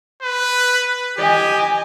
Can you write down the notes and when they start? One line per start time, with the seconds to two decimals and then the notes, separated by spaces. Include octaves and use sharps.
0.22 B4
1.18 G4 D#5 G#5